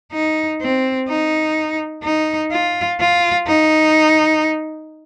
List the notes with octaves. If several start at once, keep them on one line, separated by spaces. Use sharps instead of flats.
D#4
C4
D#4
D#4
F4
F4
D#4